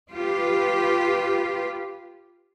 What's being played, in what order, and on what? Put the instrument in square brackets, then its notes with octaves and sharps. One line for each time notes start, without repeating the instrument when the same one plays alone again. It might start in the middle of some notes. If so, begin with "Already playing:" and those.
[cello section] F4 G4 B4